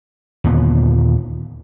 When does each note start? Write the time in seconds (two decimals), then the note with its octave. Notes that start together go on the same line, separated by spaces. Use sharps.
0.44 D#2 A#2 D3 B3